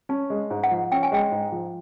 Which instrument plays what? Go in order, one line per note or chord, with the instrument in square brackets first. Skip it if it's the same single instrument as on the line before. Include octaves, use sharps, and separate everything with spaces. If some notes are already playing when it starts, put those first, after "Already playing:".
[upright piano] C#4 [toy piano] A5
[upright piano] G#3
G#2
[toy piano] F#5
[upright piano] F3
[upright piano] C#4 [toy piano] G5
[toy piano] G#5
[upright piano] G#3 [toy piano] G5
[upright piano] G#2
F3